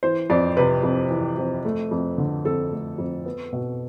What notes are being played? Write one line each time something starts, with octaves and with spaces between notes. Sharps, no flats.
E3 C5
F2 D5
C3 B4
F2
E3
F2
A3
F2
D3
F2 A4
A3
F2
B3
B2